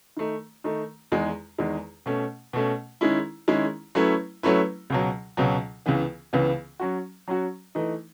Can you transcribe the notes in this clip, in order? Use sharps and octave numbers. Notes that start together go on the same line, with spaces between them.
D#3 A3 D#4
D#3 A3 D#4
E2 D#3 G#3
E2 D#3 G#3
B2 A3 C#4
B2 A3 C#4
D#3 G#3 C#4 E4
D#3 G#3 C#4 E4
F#3 A3 C#4 E4 B4
F#3 A3 C#4 E4 B4
C#2 B2 F#3
C#2 B2 F#3
C#2 C#3 E3 B3
C#2 C#3 E3 B3
F#3 C#4 F#4
F#3 C#4 F#4
E3 A3 D#4